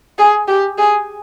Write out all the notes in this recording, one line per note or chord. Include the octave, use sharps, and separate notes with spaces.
G#4
G4
G#4